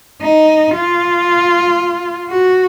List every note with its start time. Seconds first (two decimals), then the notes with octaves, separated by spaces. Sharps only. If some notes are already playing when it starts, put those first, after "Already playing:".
0.22 D#4
0.75 F4
2.30 F#4